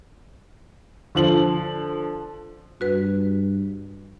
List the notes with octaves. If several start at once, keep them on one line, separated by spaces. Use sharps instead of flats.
D3 F3 F#7
G2 F#4 B4